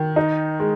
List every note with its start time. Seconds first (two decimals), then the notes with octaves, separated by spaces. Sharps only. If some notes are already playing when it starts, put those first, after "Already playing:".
Already playing: D#3
0.16 D#4
0.60 G#3